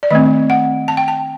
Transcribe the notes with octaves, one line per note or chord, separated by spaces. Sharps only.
D5
D#3 A3 C4 D#5
F#5
A5
G5
A5